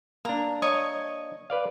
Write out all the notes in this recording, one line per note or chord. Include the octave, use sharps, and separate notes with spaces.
A#3 D4 A#5
C#5 D#5 C#6
B4 D5 F5